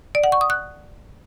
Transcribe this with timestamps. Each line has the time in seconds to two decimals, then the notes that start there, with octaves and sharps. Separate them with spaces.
0.15 D5
0.24 F#5
0.32 C#6
0.41 D#6
0.50 F#6